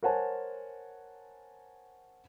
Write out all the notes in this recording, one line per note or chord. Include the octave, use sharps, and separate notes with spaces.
A#4 C5 C#5 F#5 G#5 A5